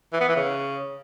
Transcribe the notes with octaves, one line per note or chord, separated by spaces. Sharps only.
E3
B3
E3
C#3